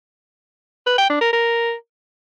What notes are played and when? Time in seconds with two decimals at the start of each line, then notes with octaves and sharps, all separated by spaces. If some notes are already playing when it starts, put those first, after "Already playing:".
0.86 B4
0.98 G5
1.10 D4
1.21 A#4
1.33 A#4